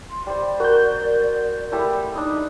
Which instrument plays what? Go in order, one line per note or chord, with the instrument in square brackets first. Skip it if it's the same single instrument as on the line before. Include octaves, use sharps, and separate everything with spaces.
[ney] C6
[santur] G3 C5 [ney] D5
[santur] F#4 [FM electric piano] A#4 G6
[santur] G3 A3 E4
[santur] D4 D#5 [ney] D#4